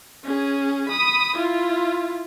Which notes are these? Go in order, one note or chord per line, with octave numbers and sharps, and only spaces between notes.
C#4 G#4
B5 D#6
E4 F4